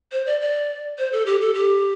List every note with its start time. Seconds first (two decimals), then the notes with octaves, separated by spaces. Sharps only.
0.12 C5
0.26 D5
0.41 D5
0.98 C5
1.13 A4
1.26 G4
1.41 A4
1.54 G4